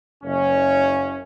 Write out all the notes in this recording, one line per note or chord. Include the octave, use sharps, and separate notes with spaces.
F#1 C#4